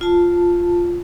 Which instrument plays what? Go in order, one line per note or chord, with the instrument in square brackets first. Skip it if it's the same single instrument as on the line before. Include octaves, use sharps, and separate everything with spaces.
[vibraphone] F4 A5